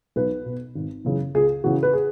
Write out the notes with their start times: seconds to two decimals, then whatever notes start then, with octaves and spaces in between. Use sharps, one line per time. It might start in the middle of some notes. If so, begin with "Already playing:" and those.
0.16 B1 B4
0.46 B2
0.75 G#1
1.05 F#2 C#3 E3
1.35 C#2 G#4
1.64 C#3 E3 F#4
1.83 B4
1.93 G#4